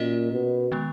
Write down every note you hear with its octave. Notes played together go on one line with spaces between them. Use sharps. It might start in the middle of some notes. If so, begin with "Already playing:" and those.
Already playing: A#2 C#4 F#4 A#4 D#5
B2
D#3 G#3 B3